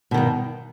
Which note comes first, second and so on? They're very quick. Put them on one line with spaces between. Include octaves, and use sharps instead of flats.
B2 D#3 G2